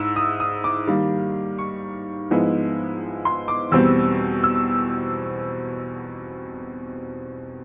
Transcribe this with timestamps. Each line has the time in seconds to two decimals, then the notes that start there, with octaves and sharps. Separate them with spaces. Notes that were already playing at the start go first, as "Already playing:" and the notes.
Already playing: G#2 E4 E6
0.16 D#6
0.40 D#6
0.64 D6
0.87 D#3 G3 A#3
1.59 C#6
2.30 G#2 F3 G#3 B3 E4
3.25 C6
3.48 D6
3.72 E2 B2 G3 C4 E6
4.44 E6